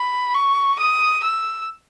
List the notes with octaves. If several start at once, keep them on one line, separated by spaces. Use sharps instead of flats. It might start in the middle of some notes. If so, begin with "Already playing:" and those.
Already playing: B5
C#6
D#6
E6